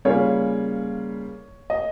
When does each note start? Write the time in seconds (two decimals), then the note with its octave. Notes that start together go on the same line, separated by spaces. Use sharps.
0.05 C#3 G3 A#3 F4 G#4 C#5
1.70 D#5